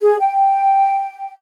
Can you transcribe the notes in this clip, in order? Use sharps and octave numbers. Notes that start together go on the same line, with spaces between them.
G#4
G5